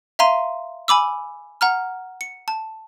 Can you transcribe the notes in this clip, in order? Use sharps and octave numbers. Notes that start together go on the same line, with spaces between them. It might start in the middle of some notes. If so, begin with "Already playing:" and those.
E5 F5 A#5 C6 D#7
G#5 B5 D6 E6
F#5 A#5 F6
C#7
A5